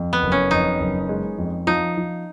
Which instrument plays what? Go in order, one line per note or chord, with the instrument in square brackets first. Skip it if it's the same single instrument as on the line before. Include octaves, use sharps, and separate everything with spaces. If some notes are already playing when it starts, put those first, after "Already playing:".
Already playing: [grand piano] F2
[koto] B3
[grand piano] F#1
[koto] C#4
[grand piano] F2 [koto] D#4
[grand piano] F#1
G#3
F2
[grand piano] F3 [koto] D#4
[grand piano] F3